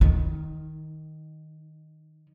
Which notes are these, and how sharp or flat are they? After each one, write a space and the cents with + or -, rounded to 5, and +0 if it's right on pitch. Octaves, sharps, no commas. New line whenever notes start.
D#3 +0 D#4 +40